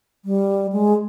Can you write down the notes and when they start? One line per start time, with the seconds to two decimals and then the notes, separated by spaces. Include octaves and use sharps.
0.25 G3
0.72 G#3